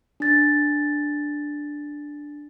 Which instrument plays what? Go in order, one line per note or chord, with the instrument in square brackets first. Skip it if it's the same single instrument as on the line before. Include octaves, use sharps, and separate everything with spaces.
[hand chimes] D4 A6